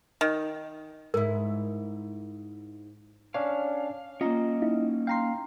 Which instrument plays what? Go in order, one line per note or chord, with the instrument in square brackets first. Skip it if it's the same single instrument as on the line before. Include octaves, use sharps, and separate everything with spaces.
[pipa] D#3
[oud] G#2 E4 [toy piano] A#4
[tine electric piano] C#4 D4 C#5 [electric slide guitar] F5
[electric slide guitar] A#3 C#4 [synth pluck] F4 A#5 [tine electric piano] D#5
[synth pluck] D#4 E4
[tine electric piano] F5 C7 [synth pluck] G5 A#5 C6